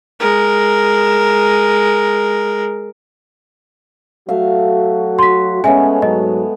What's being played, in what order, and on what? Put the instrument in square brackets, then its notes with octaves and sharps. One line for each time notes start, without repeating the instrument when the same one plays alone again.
[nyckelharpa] G#3 A#4
[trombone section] F#3 F#4 [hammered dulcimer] A3 E5 F5
[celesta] C6 B6
[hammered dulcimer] G#3 A3 B3 [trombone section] C#4 [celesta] E5 G#5
[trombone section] G#2 F#3 [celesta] D#5